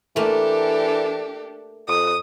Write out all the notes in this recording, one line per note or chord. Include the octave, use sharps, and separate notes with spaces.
E3 A3 A#3 D4 G4 A4
F2 D#6